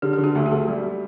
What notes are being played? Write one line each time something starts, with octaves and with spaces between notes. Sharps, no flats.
D3 G4
G4
D3
F#4
D2
F#4
A3
G3